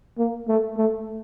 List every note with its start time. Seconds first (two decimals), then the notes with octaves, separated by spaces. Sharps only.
0.18 A#3
0.48 A3
0.78 A3